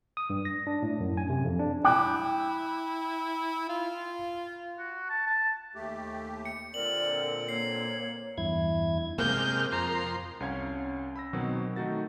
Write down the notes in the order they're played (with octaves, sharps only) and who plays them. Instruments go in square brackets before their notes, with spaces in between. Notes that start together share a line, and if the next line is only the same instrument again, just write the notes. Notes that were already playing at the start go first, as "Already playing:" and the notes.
[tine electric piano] D#6
G2
A#6
D4
A2
F#2
G#5
C3
F2
D4
[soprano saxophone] E4 [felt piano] G5 D6 F#6
[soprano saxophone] F4
[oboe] F#4
A5
A5
[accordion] D#2 A3 G4
[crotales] C#7
[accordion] A#2 D3 C4 [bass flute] A#4 [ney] D5 [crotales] F#7
[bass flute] A#3 [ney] C#5 [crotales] C7
[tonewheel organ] E2 G2 E4 G#6
[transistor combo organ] C3 G#3 F6 [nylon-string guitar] A#3 [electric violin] G6
[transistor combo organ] F2 C6 [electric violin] A#5
[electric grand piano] C2 C#4 F5 G#6
B5 E6 A#6
B2 D#3 F#3 C4 F#4
D#3 A3 D#4 F#4 A6